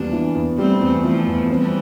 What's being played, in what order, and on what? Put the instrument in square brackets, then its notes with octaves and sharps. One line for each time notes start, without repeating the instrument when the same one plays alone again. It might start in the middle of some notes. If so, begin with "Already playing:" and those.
Already playing: [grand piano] E2 G3 [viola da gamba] A#3 D4
[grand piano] E3
E2
[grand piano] G3 [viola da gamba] A3 C4
[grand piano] E2
[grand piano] E3 [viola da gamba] F3 A3
[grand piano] E2
[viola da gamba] E3 G3 [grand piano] C4